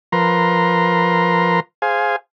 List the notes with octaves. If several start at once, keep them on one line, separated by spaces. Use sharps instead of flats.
F3 A#4 B4 A#5 C6
G#4 C5 F5 G#5